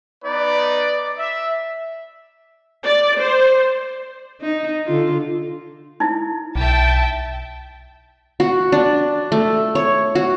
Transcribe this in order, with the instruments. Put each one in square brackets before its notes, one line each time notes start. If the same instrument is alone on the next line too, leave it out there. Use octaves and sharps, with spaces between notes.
[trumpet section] B3 D#4 B4 [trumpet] D5
[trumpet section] E5
[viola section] D5
C5
[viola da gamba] D#4
D3 F4
[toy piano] D#4 E4
[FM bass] B1 [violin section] E5 G5 A5
[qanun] F#4
D4
A3
C#5
F#4